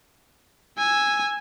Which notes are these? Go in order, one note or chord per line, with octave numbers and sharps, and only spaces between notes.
G#5 E6